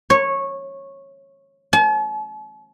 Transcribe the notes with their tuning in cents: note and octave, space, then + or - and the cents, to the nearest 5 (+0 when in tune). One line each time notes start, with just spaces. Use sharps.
C#5 -15
A5 -45